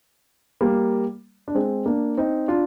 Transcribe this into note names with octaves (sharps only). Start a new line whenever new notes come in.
G3 A#3
D4
G#3 C4
A#3 D4
C4 D#4
D4 F4